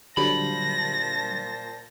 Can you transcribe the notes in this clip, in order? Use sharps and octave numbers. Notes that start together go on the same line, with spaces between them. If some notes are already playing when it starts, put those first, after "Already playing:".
A#2 D3 F#3 G3 C5 A5 B5 A#6